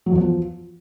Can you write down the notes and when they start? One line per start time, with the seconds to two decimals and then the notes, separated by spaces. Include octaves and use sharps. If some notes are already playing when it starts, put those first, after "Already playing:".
0.06 F#3
0.12 E2
0.18 F3